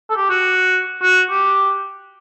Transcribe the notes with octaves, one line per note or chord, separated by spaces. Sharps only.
A4
G4
F#4
F#4
G4